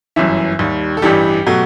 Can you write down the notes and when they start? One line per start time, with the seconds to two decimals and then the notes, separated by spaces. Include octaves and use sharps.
0.16 G1 F#2 E3 E5
0.59 D#2 D#3 G3
0.97 A4
1.02 A1 G2 E3 G3 G4
1.46 B2 F#3 A3